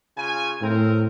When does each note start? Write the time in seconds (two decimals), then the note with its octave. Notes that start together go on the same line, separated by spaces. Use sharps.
0.16 C#3 F4 G#5
0.62 A2 C4 A#4